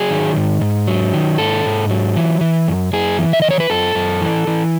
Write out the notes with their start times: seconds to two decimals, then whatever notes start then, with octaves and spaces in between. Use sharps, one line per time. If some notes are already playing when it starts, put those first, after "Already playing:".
Already playing: F#3 G#4
0.10 D#3
0.37 G#2
0.61 G#2
0.87 F#3
1.14 D#3
1.38 G#2 A4
1.65 G#2
1.90 F#3
2.16 E3
2.41 E3
2.68 F#2
2.93 F#2 G#4
3.19 E3
3.33 E5
3.42 E3 D#5
3.51 C#5
3.60 B4
3.70 F#2 A4
3.95 F#2
4.21 E3
4.47 E3